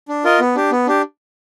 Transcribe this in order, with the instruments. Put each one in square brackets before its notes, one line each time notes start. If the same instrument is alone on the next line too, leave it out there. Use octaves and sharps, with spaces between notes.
[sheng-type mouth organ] D4
F4 A#4 D#5
B3
D4 G4
B3
D4 G4